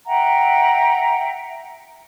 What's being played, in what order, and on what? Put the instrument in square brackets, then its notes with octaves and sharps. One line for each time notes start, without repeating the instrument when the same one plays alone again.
[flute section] E5 F#5 G5 A#5